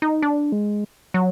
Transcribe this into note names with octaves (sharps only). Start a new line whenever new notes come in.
D#4
D4
G#3
F#3